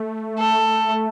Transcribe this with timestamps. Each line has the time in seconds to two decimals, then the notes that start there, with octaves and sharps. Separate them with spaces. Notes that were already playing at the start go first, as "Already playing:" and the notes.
Already playing: A3
0.38 A4